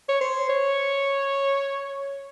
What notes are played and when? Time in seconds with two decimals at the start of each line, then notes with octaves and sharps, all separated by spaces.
0.08 C#5
0.20 C5
0.49 C#5